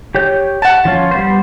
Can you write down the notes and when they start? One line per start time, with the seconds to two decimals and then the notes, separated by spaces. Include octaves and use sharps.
0.15 G4 C#5 G6
0.62 F#5 A5
0.85 F3 C#4 F4
1.11 G3 B3 C5